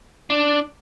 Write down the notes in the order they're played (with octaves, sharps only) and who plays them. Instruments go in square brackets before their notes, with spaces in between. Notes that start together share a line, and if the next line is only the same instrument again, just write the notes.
[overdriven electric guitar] D4